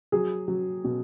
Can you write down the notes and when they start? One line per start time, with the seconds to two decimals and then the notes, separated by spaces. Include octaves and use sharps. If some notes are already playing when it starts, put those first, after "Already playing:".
0.12 F#3 G#4
0.48 F#3
0.84 B2